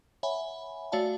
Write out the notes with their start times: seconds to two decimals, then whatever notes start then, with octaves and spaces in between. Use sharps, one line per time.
0.23 C#5 E5 F#5 G#5 B5
0.92 A3 F#4 C#5 D5 F5 A5